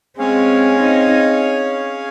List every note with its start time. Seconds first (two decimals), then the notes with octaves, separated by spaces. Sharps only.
0.18 G#3 C4 C#4 G#4 C#5 F5 G#5
0.79 C4 D#4